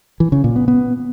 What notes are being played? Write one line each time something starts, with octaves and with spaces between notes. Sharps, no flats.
E3
C#3
A#2
B3
B3